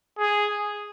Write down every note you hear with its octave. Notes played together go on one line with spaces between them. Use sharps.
G#4